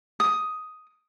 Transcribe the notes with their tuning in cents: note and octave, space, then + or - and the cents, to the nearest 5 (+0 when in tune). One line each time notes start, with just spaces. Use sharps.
D#6 +5